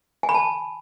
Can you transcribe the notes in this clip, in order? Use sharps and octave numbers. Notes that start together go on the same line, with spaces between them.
G#5
B5
A5